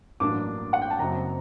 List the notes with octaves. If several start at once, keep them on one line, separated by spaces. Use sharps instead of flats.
A1 G2 F#3 A#3 D4 D6
F#5
G5
A5
F#1 F#2 F#3 C4 A#5